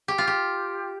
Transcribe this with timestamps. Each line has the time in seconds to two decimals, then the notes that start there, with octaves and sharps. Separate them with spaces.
0.08 G4
0.18 F4
0.27 G4